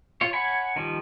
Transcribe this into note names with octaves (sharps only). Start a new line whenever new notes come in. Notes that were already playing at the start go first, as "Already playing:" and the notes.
F4 C#5
C#5 F#5 G#5 B5
D#3 F3 G3